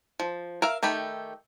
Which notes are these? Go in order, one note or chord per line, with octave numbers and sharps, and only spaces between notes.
F3
A#4 E5 F5
D#3 A3 G4 B5